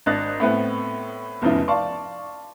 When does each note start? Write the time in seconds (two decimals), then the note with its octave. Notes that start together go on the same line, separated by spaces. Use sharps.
0.06 G#1 D4 D#5 F#6 A6
0.40 A2 A3 B3 C4
1.42 F1 E2 C#3 F3 D#4 E4
1.68 D5 F5 A5 C6 C#6